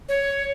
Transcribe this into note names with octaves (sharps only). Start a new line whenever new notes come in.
C#5